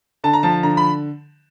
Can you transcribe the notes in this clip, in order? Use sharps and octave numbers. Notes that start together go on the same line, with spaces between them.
D3 A5
A#5
F3 A5
D3 A#5
B5